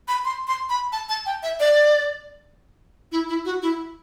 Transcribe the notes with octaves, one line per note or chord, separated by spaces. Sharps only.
B5
C6
C6
B5
A5
A5
G5
E5
D5
E4
E4
F#4
E4